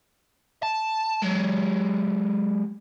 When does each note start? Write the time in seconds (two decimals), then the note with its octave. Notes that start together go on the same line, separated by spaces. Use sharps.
0.63 A5
1.22 F#3 G#3